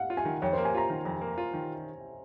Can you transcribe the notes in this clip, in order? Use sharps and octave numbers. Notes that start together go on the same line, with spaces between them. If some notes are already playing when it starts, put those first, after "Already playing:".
Already playing: F5 F#5
F4
G#5
D#3
F2 C#5
C5
A#3
G#5
F4 A#5
D#3
F2
A#3
F4
D#3